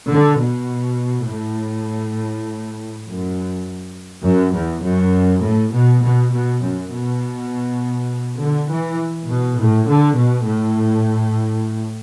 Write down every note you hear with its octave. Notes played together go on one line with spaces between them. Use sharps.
D3
B2
A2
F#2
F#2
E2
F#2
A2
B2
B2
B2
F#2
B2
D3
E3
B2
A2
D3
B2
A2